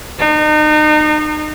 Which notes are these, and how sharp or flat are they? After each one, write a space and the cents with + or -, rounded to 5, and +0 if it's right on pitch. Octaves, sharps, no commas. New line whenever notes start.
D#4 -35